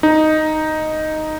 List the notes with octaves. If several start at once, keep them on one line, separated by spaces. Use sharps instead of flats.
D#4